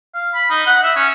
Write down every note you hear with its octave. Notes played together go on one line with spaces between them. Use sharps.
F5
B5
D#4
F#5
E5
C#4